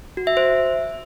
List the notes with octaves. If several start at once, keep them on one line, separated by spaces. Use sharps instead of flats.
F#4
E5
C5